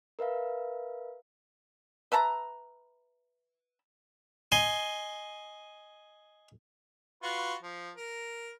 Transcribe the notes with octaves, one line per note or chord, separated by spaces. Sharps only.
A#4 B4 E5 F5
B4 E5 A5 A#5
D#5 G#5 C6
F4 F#4 B4
F3
A#4